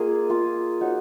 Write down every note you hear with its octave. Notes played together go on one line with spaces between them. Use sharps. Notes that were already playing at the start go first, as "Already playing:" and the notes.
Already playing: A#3 F4 G#4 D#5
A#3 F4 G#4
D#4 F#4 C#5